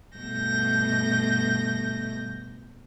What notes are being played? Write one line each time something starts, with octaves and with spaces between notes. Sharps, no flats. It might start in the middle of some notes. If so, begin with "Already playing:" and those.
G2 B2 A3 G6 A#6